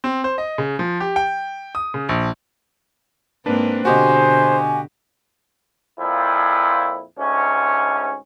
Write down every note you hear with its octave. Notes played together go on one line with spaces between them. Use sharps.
C4
C5
D#5
C#3
F3
G4
G5
D#6
C#3
A#1
G#2 A#3 C4 D4 B4
B2 D3 F#4 G4 C5 D#5 G#5
F2 A#2 F3 E4
D2 G#2 C#4